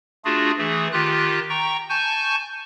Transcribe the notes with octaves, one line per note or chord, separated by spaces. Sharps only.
A3 D4 F4 F#4 G#4
E3 A3 G#4
D#3 F4 G4 F#6
G5 A#5 C#6
G#5 A5 C#6 G6